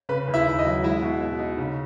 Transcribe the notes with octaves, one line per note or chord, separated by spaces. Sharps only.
C#3 B4 B5
D#2
E4 E5
D#2
D#5
F#3
G#3 E4 E5
B2
B2
D#4
C#3